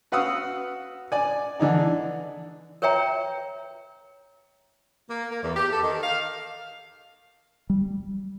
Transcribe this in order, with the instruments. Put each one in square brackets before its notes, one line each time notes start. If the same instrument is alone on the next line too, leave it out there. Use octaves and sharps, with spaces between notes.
[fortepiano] F#4 B4 F5 F#5 D#6 E6
D5 G#5
D3 E3 D4 D#4
[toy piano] A#4 B4 C#5 E5 G5 A#5
[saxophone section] A#3
A#3
E2
G4
A4
D#3
F5
[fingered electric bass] G3